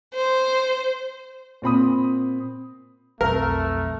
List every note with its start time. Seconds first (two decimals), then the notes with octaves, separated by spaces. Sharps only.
0.14 C5
1.62 A#2 C4 B5 D#6
3.21 B1 F2 A3 A#4